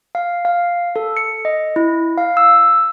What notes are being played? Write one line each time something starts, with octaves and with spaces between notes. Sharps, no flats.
F5
F5
A4
C#7
D#5
E4
F5
E6